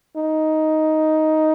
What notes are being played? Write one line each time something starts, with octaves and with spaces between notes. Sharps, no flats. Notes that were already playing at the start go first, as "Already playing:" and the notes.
D#4